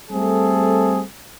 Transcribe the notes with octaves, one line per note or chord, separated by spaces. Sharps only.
G3 A3 C4 G#4 A4